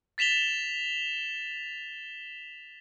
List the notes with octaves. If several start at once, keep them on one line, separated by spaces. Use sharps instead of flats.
A6 B6 E7 F7 G7